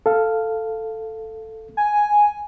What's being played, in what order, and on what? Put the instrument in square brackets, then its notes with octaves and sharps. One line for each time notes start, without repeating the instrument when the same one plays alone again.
[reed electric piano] A4 F5
[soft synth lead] G#5